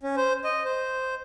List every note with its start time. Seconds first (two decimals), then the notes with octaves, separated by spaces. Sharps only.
0.03 C#4
0.17 C5
0.44 D#5
0.65 C5